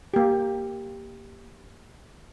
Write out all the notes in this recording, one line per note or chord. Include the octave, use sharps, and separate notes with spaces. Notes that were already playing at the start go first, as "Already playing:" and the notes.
A#3 G4